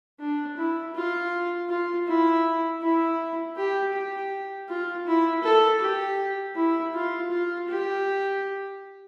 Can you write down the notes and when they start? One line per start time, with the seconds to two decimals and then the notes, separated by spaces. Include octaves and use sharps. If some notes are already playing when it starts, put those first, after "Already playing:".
0.19 D4
0.57 E4
0.95 F4
1.69 F4
2.07 E4
2.82 E4
3.57 G4
3.93 G4
4.69 F4
5.07 E4
5.44 A4
5.80 G4
6.55 E4
6.94 F4
7.31 F4
7.68 G4